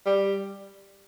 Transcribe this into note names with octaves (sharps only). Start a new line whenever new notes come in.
G3